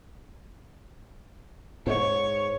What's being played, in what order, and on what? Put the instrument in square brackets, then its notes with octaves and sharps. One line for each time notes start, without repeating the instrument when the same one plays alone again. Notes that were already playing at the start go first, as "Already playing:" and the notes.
[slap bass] G#2 [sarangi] C#5